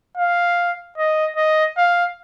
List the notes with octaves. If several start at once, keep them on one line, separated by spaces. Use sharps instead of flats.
F5
D#5
D#5
F5